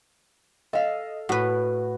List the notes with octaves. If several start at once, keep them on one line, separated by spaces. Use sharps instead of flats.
A4 D#5 F5
A2 F#4 B4